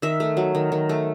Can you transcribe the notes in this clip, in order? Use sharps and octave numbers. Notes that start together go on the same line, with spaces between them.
D#3 E5
A3
F#3
D#3
D#3
A3